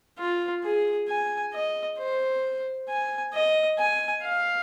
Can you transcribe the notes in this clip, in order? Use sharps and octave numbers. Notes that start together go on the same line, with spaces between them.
F4
G#4
G#5
D#5
C5
G#5
D#5
G#5
F5